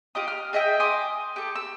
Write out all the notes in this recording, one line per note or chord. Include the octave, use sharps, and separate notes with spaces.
F4 G4 D#5 D#6
F6
G#4 D#5 E5 G5
G#5 C6 D6 D#6
G4 A4
E6